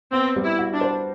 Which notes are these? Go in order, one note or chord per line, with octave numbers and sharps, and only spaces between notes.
B3 C4
G3
E4
F#4
D4
C5